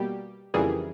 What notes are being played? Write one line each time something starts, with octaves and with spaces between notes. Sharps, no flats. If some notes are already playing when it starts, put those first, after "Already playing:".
Already playing: B2 G3 A#3 G4
F2 C#3 E3 G3 A#3 G#4